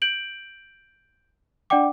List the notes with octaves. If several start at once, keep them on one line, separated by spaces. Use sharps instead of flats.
G6 D7 F#7
D4 D5 F#5 G5 D6